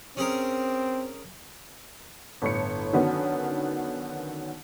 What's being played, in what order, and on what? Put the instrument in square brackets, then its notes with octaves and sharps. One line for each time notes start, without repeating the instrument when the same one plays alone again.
[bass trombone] C4 [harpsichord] C#4 G#4 A#4
[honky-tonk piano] G1 A2 C#5 C#7
D3 D#3 F#3 B3 C#4